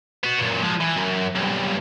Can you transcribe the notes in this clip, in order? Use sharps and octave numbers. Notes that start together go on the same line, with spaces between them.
B3 F#4
F#2 A#2
F3 G#3
E3
F#2
B1 G2